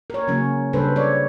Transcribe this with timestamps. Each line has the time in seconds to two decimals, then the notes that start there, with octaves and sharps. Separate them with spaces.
0.10 A#4 C#5
0.27 C#3 F#3 A#3 C#4
0.73 C#3 G3 D4 A4 B4 C5
0.96 C#5 D5